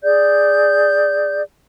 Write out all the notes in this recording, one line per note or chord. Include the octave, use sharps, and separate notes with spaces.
G#4 D5 G6